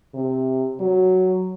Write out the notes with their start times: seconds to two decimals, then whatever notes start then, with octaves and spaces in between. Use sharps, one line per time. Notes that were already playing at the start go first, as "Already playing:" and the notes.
0.14 C3
0.80 F#3